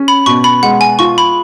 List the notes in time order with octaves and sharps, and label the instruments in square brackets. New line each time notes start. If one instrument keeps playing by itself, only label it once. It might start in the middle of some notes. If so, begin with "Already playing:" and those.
Already playing: [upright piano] C#4
[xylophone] B5
[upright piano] B2 [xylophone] C#6
[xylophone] B5
[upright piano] G#3 [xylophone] F#5
[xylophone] G#5
[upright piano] F4 [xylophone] C#6
[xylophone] B5